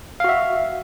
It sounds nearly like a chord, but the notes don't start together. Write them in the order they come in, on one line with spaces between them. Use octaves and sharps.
F5 F#4 E5